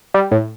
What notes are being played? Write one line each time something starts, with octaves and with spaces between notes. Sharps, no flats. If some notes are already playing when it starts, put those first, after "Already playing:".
G3
A2